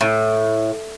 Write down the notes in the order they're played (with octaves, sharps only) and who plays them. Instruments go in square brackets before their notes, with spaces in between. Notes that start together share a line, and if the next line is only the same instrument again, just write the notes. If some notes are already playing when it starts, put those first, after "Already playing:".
[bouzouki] A2